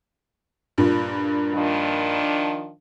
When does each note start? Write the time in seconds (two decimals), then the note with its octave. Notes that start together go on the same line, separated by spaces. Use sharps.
0.78 G2 A#2
1.54 D#3 F3 D4